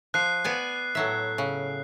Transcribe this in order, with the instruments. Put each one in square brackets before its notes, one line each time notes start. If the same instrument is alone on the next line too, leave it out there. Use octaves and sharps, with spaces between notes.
[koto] F3 [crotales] F#6 C7
[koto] B3 D5 G#5
A2 F#3 E5
C#3